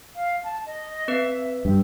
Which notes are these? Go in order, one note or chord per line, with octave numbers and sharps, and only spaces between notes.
F5
A5
D#5
C4 B4 E5
G2 C4